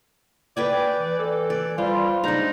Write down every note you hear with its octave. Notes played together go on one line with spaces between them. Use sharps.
B4 D5 G5 G#5
E3
A4
D5
G3 F4 C5
G#3 D4 D#4 A#5